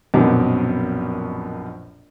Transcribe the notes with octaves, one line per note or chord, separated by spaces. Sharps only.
A#1 F#2 B2 C4 D#4 D6